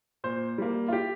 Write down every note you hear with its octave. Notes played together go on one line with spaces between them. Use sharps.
A#2 C5
G3 A#3
F4
G4